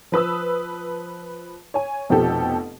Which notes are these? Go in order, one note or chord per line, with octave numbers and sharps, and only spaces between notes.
F3 B4 D#6 E6
C#5 G#5
F1 B2 F3 G4 A4